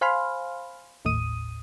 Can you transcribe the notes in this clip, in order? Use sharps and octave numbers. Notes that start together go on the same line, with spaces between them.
C5 F5 G#5 B5 C6 F6
G#1 D#2 A2 D#6 D#7